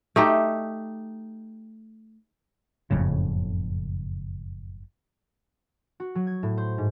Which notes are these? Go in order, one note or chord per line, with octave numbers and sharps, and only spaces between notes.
A3 D#4 G4
F#1 F2 A2 C#3
F#4
F#3
G#6
A2
C5
G#2